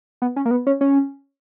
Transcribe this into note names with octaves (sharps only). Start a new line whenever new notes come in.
B3
C#4
A#3
B3
C#4
C#4